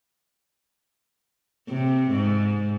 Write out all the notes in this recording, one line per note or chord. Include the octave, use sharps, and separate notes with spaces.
C3
G#2